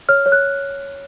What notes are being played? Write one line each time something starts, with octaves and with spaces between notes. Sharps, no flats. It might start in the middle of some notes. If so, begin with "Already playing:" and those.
C#5 F6
C#5
F#6